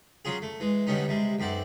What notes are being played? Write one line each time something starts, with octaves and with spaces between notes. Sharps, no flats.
F#3 C#4 F4 G#4
A3
E3 G#3
B2 D3 G3 B3 C#4 D#4
C3 G3 G#3
B1 F#2 C4 D5 F#5